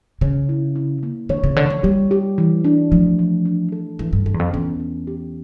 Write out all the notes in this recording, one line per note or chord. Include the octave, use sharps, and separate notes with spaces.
C#3 C#5
E4
E4
A#3
D3 C#5
C#3
D3 C#5
F3
G3 G4
G4
E3
D4
F3 A3
A3
D4
A4
E3 A4
G2
G2 A4
E2
F2
E2 C#4
C#4
G4